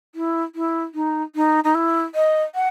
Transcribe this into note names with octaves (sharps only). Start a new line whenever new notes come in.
E4
E4
D#4
D#4
D#4
E4
D#5
F#5